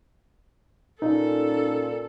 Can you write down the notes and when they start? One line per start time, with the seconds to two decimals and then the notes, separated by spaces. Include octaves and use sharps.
1.02 A#2 C#4 D#4 A4